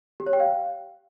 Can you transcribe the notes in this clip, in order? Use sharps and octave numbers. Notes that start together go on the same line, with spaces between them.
G4
C#5
G5
F5